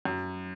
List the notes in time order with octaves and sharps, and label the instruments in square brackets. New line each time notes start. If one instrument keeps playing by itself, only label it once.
[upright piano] F#2